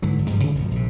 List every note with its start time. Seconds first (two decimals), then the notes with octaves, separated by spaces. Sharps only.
0.02 G#2 D3 E3 F#3
0.19 G#1
0.30 G2 F3 G3
0.44 C3 E3 G#3 A3
0.55 G1 B2 F3
0.71 A#1 C3